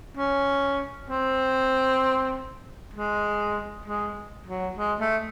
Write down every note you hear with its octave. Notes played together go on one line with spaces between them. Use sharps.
C#4
C4
G#3
G#3
F#3
G#3
A3